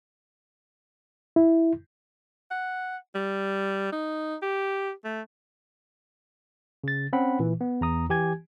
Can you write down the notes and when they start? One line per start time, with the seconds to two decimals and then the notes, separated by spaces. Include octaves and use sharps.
1.36 E4
2.51 F#5
3.15 G3
3.92 D#4
4.42 G4
5.05 A3
6.84 C#3 A6
7.13 C4 C#4 F#5 B5
7.39 A#2 E3
7.61 B3
7.81 E2 A#5 D#6
8.10 E3 G4 G#5 G#6